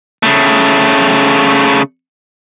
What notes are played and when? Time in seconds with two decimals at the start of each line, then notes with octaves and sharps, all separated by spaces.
0.23 C#3 A3